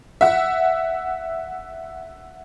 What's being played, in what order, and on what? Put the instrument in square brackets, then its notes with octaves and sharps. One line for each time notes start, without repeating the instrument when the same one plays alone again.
[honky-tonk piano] E5 F#5